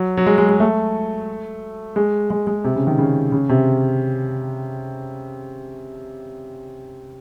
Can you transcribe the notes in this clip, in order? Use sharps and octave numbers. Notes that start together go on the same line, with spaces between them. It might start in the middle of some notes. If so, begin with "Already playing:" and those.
Already playing: F#3
F#3
G#3
G#3
G#3
A3
G#3
G#3
G#3
C3
C#3
D#3
C#3
C#3
C3